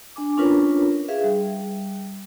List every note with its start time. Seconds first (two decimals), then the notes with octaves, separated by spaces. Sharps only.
0.16 D4 G#5 D6
0.37 C#4 D4 F4 A#4 B4 C#5
1.09 G#4 B4 E5 F5
1.24 G3